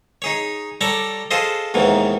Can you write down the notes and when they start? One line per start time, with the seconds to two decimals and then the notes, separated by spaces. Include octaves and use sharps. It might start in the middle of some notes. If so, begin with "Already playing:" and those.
0.22 D#4 G#4 C#5
0.81 G3 A4 C#5 D5 A#5 C#6
1.31 F4 G#4 A4 C5 D#5
1.74 D#2 G#2 B2 D#3 E3